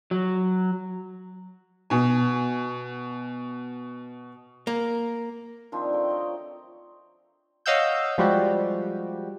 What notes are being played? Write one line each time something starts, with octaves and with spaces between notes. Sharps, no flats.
F#3
B2 G#5
A#3
D#3 F3 C4 D4
A3 G5
A#4 C#5 D#5
C#5 D#5 F5 F#5 E6 G6
F3 G3 G#3 F#4 G4